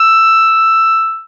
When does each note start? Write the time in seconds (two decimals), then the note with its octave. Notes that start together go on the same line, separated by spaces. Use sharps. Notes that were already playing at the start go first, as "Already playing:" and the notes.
Already playing: E6